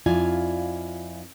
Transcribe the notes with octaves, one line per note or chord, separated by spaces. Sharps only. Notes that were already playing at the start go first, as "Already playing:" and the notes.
F2 E4 F4 D5 F5 G#5